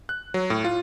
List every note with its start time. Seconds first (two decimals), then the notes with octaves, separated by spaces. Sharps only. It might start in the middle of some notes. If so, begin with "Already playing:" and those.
0.09 F#6
0.34 F#3
0.50 A2
0.64 F4